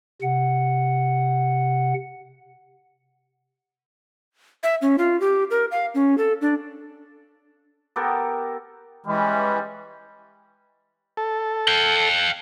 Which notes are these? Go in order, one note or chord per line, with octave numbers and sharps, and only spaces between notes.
C3 F#5
E5
C#4
F4
G4
A#4
F5
C#4
A4
D4
B3 G4 A4 A#4
E3 G3 G#3 C#4 B5
A4
F5 G5